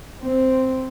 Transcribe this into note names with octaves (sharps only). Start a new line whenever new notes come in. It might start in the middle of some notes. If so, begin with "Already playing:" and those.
C4